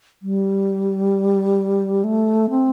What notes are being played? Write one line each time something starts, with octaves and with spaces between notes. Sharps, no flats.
G3
A3
C4